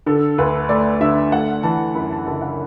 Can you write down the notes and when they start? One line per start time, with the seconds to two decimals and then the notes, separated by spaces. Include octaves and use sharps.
0.06 D3 A4
0.38 D2 B4
0.69 A3 D5
1.01 D3 E5
1.32 A3 F#5
1.63 E3 A5
1.95 F#2 B5
2.11 A5
2.27 F#1 A5
2.42 F#5